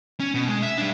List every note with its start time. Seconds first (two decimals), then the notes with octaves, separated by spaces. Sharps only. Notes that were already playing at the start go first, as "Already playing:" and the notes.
0.20 C#4
0.34 B2
0.48 G#3
0.63 E5
0.78 G3 D4